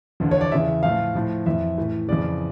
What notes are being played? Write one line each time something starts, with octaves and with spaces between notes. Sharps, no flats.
E2 D3 F3
C#5
D5
E2 C#3 E3 E5
A2 F3 F5
A2 F3
F2 E3 E5
A2 E3
F2 C#3 E3 D5